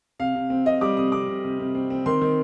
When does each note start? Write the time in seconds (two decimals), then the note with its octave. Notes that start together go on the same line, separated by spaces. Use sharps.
0.19 C3 F5
0.35 C3
0.50 C4
0.65 C3 D#5
0.81 G3 D6
0.97 C3 D#6
1.12 C3 D6
1.28 C3
1.44 C3
1.59 C3
1.75 C4
1.90 C4
2.06 D#3 C6
2.21 D#3